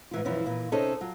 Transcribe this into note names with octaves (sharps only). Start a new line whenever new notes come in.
G#2 E3 F4
F#2 B2 E3 F3 E4
D#2 A#2 E3
C3 C#4 D#4 A4 C5 D#5
F#3 F4